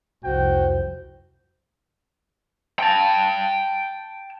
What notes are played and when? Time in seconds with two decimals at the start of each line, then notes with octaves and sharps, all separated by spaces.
0.24 C2 F2 F#4 C5 G5
2.79 G5 A5